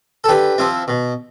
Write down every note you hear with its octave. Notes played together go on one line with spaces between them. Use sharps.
A4
D3 G4 B4
F3 C4 E4
B2